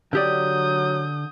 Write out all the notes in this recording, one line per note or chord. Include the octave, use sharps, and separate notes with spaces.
D3 F#3 G4 D5 D#6 G6